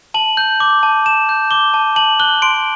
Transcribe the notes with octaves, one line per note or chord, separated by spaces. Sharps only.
A5 F#7
G6
D6
A5
A5 E7
G6
D6 G7
A5
A5 F#7
F#6 G7
C6 D7